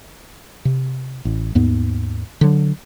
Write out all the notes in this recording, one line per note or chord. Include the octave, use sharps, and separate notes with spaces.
C3
A1
D#2 G#2 B3
D3 F#3